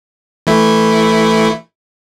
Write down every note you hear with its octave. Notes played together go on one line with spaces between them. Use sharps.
E3 A3 E4